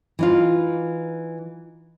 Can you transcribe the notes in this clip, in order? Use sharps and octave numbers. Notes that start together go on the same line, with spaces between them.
E3 D#4 F4